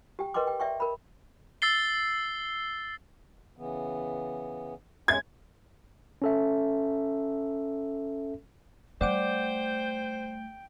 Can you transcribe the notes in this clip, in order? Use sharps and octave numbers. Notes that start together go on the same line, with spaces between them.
G4 G5
A#4 B4 D#5 G5 C6 D6
G5
D5 E5 G5 C#6
A#4 B5
E6 A6 C7 G7
C#3 E3 B3
G#3 C#4 G#6
C#4 A4 E5
G3 A3 C5 D5 F#5 G5 D6